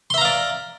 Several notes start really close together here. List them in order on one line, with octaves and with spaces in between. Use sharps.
C6 E5 A#5 F5 D5